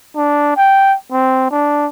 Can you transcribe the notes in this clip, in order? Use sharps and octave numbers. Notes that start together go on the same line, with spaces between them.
D4
G5
C4
D4